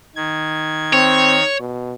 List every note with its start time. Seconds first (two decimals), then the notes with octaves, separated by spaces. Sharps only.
0.16 D#3 G#6
0.93 C4 C#5
1.60 B2